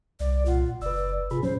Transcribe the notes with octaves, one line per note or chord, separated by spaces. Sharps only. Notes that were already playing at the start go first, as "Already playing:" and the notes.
C2 D5
A#2 F4 F#5
F#1 B4 D5 E6
G#2 C3 F4 G#4 B5
F2 A#2 F#3 C#4 C5